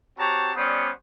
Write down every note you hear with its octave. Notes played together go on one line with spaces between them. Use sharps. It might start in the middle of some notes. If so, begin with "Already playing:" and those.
C4 F#4 G4 C#5 A5 A#5
G3 B3 C#4 C5 D5 D#6